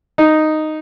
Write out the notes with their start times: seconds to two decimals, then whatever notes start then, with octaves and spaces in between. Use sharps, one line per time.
0.18 D#4